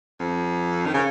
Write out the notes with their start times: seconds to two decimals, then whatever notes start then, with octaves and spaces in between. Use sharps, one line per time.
0.20 F2
0.86 D#3
0.94 C#3